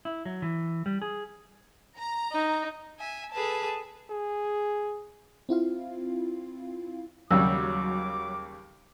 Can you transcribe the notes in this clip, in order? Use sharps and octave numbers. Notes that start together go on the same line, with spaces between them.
E4
F#3
E3
G3
G#4
A#5
D#4
E5 G#5
G#4 A4 B4 A5
G#4
C4 E4 F4 F5
D#2 C#3 F#3 G3 D6 E6